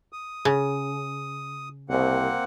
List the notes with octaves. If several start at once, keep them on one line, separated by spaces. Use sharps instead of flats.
D#6
C#3
C2 A#3 C4 F#5